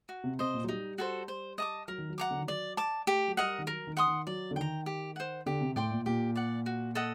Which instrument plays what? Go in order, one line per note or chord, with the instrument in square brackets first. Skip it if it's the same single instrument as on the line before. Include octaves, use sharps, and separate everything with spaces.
[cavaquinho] F#4
[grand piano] C3
[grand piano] C3 [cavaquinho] C5 D#5
[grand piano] A#2
F#3
[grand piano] G3 [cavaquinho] D#4
[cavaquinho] F#4 A4 C5
C5
D#5 A5 D6
[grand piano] F#3 [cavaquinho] A#4
[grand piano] D#3
F#3
[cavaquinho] F#5 A#5 D6
[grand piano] D3
D#3
[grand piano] F#3 [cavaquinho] D5
[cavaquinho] A5 D6
[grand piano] A3 [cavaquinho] G4
[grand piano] F#3
[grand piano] G3 [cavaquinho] A#4 D#5 F#5
[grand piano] D#3
[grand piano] F#3 [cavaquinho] A#4
[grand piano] D#3
[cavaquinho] F#5 C6 D#6
[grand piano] D#3
[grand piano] F#3 [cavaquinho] D5
[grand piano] D3
[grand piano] D#3 [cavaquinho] G5 A#5
[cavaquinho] G4
C5 F#5
[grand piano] D3 [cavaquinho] G4
[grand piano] C3
[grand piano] A2 [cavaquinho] D5 G5 C6
[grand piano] A#2
[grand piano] A#2 [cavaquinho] G4
[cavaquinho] D5 F#5
F#4
A4 D#5 F#5